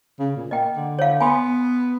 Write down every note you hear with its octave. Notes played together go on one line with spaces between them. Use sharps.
C#3
A#2
A#3 D#5 G5
D3
C#5 F5
B3 G#5 B5 C6